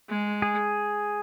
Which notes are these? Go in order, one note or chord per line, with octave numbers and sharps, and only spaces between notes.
G#3
G#4